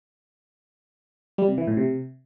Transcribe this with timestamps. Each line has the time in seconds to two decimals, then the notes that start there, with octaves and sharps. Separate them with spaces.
1.38 G3
1.48 C3
1.58 E3
1.67 A2
1.77 C3